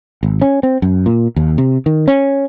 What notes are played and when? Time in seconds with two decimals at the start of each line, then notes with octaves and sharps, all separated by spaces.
0.23 G#1
0.42 C#4
0.63 C4
0.82 F#2
1.06 A#2
1.36 D#2
1.58 C3
1.86 D#3
2.08 C#4